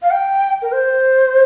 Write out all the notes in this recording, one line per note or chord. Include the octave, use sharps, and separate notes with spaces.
F5
G5
A#4
C5